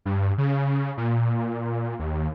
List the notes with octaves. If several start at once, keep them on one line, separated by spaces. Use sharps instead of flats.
G2
C#3
A#2
D#2